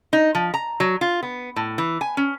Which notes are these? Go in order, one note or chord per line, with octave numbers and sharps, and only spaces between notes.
D#4
F3
A#5
F#3
F4
B3
A2
E3
G#5
C#4